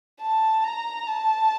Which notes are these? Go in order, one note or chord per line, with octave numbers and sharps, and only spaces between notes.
A5
A#5
A5